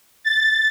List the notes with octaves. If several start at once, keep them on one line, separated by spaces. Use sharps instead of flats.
A6